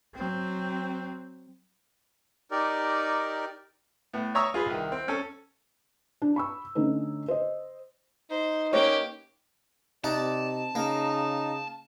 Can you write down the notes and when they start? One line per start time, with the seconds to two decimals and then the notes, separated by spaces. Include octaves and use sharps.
0.15 F#3 C4
2.51 D#4 G4 A#4 D5
4.14 A2 B3
4.35 C#5 E5 A#5 C#6 D#6 E6
4.54 F4 G#4 B4
4.66 C2 D#3
4.92 C4
5.08 C#4 A4
6.22 D4
6.36 B5 C#6 E6
6.75 D3 A3 C#4 D#4
7.28 C5 D#5
8.31 D#4 C5
8.73 A#3 C#4 G4 B4 C#5
10.04 C3 D#4 D5 F#5 A5
10.75 C#3 A#3 D#4